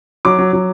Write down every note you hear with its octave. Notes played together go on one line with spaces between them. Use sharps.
F#3 D6
F#3
F#3